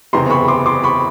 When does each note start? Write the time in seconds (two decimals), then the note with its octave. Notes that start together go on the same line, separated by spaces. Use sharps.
0.13 F#1 E2 C3 A#5 C6
0.31 B5 C#6
0.48 C6 D6
0.66 C6 D6
0.84 B5 C#6